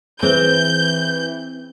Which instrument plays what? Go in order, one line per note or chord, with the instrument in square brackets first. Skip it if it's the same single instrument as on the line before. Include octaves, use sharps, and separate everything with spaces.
[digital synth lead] E3 [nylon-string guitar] C4 [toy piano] G#4 B4 C5 [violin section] G6